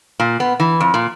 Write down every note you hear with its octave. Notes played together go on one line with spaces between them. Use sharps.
A#2
B3
E3
F2
A#2